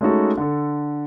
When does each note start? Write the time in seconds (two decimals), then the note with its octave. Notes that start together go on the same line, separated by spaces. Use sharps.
0.01 G#3 A3 C#4 D#4 F#4 A4
0.38 D3 A4